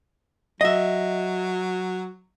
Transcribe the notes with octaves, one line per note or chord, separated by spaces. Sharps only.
F#3 D#5 E5